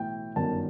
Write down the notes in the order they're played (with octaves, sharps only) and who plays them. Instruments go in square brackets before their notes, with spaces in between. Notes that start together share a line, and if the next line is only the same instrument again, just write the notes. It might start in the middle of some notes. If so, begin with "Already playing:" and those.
Already playing: [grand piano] B1 A2 E3 G5
G1 F#2 D#3 A5